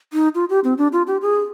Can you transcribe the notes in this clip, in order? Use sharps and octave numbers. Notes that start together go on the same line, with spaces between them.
D#4
F4
G4
C4
D4
F4
G4
G#4